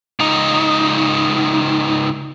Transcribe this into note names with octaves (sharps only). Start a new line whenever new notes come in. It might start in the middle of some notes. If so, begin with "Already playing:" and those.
C#2 D#4